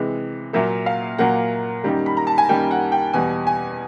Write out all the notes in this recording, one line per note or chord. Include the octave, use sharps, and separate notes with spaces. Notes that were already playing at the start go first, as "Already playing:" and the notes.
Already playing: C3 E3 G#3
A#2 F#3 A#3 E5
F5
A#2 F#3 A#3 F#5
F#2 D#3 G3 A#3
B5
A#5
A5
G#5
F#2 D#3 G3 A#3 G5
F#5
G5
E2 B2 G3 G#5
G#5